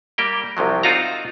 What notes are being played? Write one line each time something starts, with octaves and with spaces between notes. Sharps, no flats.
G3 A#3 G4 G5
C2 C3 F3 F#3
C4 D#4 F4 F#4 F5 A#5